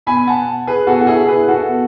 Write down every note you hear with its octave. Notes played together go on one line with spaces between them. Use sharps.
B2 G#5 B5
F#5 A5
G#4 B4
B2 F#4 A4
F#4
E4 G#4
G#4 B4
F#4 A4
B2